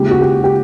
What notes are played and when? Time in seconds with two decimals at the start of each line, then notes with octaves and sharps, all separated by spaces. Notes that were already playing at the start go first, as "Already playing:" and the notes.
Already playing: D#2 C#3 F3 G#3 G4
0.11 F#4
0.21 G4
0.44 G4